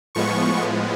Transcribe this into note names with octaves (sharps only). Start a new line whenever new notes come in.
A2 F3 G#3 B3 C#6